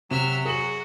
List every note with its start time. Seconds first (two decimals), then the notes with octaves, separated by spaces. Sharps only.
0.11 C3 F#3 E5 F6 E7
0.45 F#4 G#4 F#7